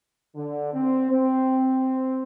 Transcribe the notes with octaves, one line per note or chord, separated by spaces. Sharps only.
D3
C4
C4